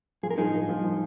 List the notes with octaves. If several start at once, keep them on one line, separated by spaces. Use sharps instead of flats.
F3 G#4
A#4
F3 D#4 G#4
F3
F3
F3